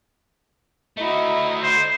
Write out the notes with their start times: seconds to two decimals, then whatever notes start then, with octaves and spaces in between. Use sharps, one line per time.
0.97 A3 D#4 E4 F#4 D#5
1.62 C5